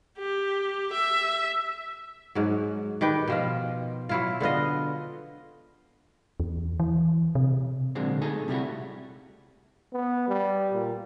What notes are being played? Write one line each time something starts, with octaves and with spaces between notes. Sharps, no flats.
G4
E5
G#2 F#3
D#3 G4 B4 G5
B2 F3 F4
F#3 E4 F4
D3 B3 F4 D#5
E2
E3
C3
A#2 D3 F#3 G#3 A#3 C4
A3 D#4 G#4 A4
A2 C3 G3 A3 E4 F#4
B3
G3
A#2